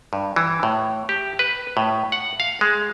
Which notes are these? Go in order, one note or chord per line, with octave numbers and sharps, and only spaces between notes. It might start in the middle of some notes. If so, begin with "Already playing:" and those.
G2
E3
A2
G4
B4
A2
F#5
F5
G#3